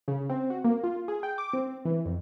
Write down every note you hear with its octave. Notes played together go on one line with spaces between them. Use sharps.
C#3
C4
F#4
A#3
F4
G#4
G5
D6
C4
E3
F2